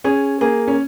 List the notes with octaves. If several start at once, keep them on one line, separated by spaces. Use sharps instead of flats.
C#4 G#4
A#3 G#4
C#4